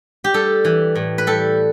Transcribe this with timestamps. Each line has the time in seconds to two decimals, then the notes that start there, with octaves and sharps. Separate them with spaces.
0.24 G4
0.34 G3 A4
0.65 E3
0.95 A2
1.18 B4
1.27 G3 A4